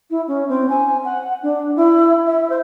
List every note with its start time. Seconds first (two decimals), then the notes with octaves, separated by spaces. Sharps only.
0.10 E4
0.28 C#4
0.49 C4
0.69 G#5
1.05 F#5
1.43 D4
1.76 E4
2.26 E5
2.50 C5